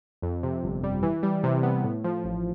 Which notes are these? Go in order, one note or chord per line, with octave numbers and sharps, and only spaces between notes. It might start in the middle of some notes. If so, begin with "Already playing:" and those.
F2
C3
G1
G3
E3
G3
C3
B3
A2
F3
A1